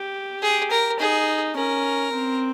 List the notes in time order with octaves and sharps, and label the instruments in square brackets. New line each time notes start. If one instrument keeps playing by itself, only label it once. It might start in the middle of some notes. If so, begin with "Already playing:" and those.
Already playing: [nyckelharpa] G4
[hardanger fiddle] G#4
A#4
[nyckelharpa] D#4 [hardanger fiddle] G#4
[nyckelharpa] C#4 [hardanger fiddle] A#4
[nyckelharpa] C4